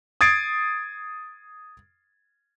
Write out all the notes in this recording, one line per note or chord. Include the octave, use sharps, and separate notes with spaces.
D#6 G#6 A6 C7 D7